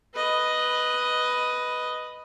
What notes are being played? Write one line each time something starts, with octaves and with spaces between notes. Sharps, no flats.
B4 D#5